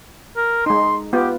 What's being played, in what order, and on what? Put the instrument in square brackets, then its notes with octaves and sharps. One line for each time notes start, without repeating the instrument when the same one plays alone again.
[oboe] A#4
[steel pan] G#3 D#4 [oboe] C6
[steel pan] B3 F4 [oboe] G4